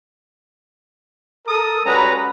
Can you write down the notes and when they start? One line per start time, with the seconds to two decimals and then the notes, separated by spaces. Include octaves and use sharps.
1.47 A4 A#4 D#6
1.85 G3 G#3 C#4 F#4 B4 A#5